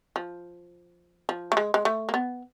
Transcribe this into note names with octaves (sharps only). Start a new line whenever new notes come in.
F3
F3
A3
G#3
G#3
A3
A#3
B3